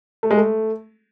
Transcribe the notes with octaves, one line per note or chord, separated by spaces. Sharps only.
A3
G#3
A3